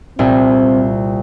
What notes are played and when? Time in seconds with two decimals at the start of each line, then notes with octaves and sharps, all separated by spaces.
0.19 C2 A#2 C4